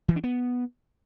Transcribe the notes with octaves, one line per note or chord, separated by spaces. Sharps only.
E3
D4
B3